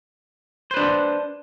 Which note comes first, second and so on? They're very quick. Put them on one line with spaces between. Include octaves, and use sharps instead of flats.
C5 B4 D4